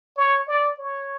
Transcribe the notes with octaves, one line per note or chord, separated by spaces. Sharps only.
C#5
D5
C#5